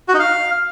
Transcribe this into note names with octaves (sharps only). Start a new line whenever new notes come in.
F#4
D#4
F5